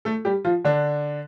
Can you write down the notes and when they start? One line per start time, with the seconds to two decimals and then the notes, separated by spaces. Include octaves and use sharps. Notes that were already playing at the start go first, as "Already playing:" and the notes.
0.05 A3 A4
0.25 G3 G4
0.45 F3 F4
0.65 D3 D4